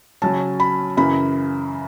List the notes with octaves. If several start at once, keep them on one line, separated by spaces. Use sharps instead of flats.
C#3 F#3 C#4 A5
B5
F#2 C#3 E3 B5